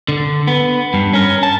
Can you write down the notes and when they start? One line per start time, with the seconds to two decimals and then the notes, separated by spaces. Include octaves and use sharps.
0.09 D3
0.47 B3
0.94 G2
1.13 C#4 A#4
1.43 A5